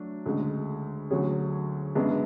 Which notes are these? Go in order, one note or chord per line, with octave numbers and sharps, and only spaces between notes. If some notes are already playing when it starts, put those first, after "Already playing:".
Already playing: F#3 A3 D4
D2 C#3 G#3
D2 D3 F#3 C#4 G#4
F#2 C#3 G#3 B3 D4